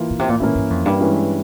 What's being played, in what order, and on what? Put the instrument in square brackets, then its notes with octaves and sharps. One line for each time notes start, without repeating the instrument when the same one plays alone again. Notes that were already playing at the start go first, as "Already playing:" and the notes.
Already playing: [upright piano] E3 A#3 F4
[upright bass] A#2
C3
A#2
[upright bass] A#2 [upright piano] E3 A#3 C#4 E4
[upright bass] G2
F2
G2
[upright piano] E3 G#3 C#4 E4